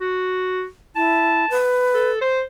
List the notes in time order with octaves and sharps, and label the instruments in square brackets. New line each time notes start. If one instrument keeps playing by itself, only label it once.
[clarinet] F#4
[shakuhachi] E4 [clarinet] A5
[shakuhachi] B4
[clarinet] A4
C5